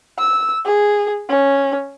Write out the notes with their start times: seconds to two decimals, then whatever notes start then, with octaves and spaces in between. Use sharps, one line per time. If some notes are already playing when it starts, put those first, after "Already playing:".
0.18 E6
0.65 G#4
1.29 C#4